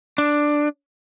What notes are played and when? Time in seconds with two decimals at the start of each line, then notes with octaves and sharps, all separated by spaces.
0.18 D4